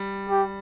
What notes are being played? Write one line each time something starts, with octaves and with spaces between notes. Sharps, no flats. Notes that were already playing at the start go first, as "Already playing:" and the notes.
Already playing: G3
G4